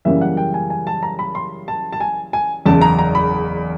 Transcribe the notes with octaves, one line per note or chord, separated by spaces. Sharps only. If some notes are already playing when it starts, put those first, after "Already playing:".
F#2 C#3 E3 G3 A#3 E5
F#5
G5
G#5
G#5
A5
A#5
B5
C6
A5
A5
G#5
G#5
F#1 E2 C#3 A5
A#5
A#5
B5